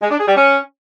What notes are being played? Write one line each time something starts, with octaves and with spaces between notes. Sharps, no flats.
G#3
D4
G#4
G3
C#4